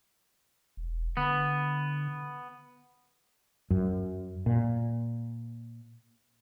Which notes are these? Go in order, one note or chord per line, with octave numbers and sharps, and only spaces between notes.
E1
D3 B3
F#2
A#2